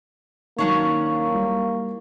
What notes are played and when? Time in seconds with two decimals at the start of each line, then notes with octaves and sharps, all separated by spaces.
0.59 D#3 F#3 A#3 C#4 D4 C#5
1.32 G3 E4